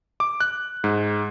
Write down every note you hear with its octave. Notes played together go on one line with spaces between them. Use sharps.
D6
F#6
G#2